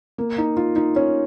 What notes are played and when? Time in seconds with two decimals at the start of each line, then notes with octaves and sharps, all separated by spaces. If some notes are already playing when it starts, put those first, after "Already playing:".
0.18 A#3
0.38 D#4
0.57 F4
0.76 D#4
0.96 C#4